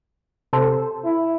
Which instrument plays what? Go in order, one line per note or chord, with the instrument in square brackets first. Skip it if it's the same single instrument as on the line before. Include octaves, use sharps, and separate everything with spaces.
[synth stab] C3 A4 C5
[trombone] E4